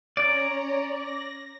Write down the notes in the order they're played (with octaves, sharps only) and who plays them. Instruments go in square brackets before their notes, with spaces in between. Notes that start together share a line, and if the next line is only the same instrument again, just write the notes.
[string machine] C#4 C#5 A#5 [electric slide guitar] D5
[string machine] A#6